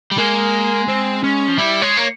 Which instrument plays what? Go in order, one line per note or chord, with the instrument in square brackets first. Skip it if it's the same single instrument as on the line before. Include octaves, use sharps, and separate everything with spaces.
[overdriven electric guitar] G3
[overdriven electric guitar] G#3 [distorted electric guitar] A#3
[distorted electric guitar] C4
C#4
[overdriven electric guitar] F3
[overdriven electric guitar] G3 [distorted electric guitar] E4
[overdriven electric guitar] G#3 [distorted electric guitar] C#5
[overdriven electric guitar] A#3